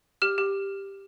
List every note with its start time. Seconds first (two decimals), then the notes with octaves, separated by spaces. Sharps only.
0.22 G4 F6
0.38 G4